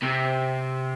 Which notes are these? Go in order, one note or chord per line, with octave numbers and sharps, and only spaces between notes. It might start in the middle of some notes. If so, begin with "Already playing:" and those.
C3